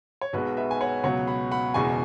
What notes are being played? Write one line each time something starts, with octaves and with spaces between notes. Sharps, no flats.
C#5
B1 B2 G#3 F#4 B4
B4 E5
G#5
C#5 F#5
C#2 B2 F#3 B3 C#5 F#5
F#5 B5
F#5 B5
F#1 E2 B2 G#3 G#5 C#6